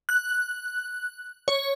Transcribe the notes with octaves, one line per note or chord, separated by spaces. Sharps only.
F#6
C#5